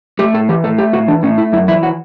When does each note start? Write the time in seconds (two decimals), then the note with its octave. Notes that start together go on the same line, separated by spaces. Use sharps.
0.19 A3 G4
0.34 A2 A4
0.49 E3 G4
0.64 A2 A4
0.78 A3 G4
0.93 A2 F#4
1.08 E3 D4
1.23 A2 C#4
1.38 A3 E4
1.52 F#2 E4
1.68 E3 E4
1.83 F#4